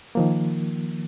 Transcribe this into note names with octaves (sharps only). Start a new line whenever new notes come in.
D#3 F3 A#3